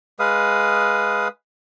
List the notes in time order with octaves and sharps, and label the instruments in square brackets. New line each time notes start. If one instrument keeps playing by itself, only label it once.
[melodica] G#3 B4 F5 D#6